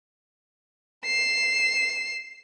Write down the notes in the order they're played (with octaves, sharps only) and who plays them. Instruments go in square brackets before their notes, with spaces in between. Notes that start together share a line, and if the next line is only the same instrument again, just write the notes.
[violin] C7 E7